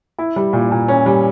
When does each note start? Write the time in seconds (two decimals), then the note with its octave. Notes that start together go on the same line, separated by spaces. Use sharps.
0.18 E4
0.36 G3
0.53 A#2
0.71 A#2
0.88 C#4
1.06 G3